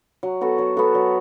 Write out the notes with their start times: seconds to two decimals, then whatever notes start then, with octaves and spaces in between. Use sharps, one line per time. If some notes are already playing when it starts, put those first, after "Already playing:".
0.23 F#3
0.41 B3 F#4 A4
0.58 F#3
0.77 B3 F#4 A4
0.95 F#3